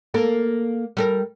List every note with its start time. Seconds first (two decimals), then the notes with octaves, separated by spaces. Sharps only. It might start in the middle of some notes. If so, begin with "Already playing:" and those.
0.14 A#3 A4 A#4
0.97 G3 A4 A#4